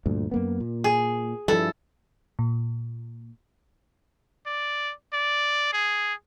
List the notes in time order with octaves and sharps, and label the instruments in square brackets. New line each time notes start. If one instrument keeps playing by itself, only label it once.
[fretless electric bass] D2 G2 A#2
F#2 A#3 B3
A#2
[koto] G#4
[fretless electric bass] G2 F3 [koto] E4 A4
[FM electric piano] A#2
[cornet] D5
D5
G#4